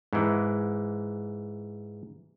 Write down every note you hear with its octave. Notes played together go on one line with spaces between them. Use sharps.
G#2 E3